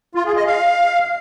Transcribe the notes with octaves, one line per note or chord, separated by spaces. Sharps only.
F4
G#4
D#5
F5